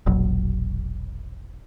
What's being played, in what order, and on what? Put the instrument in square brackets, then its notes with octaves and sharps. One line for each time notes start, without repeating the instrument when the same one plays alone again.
[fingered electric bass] E1 A#1 F#3